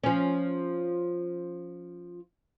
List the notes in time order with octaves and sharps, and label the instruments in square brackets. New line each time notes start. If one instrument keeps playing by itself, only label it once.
[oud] F3 C#4